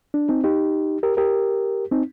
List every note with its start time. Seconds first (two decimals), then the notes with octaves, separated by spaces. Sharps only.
0.14 D4
0.29 C4 D#4
0.44 D#4 G4
1.03 G4 A#4
1.17 G4 A#4
1.92 C4 D#4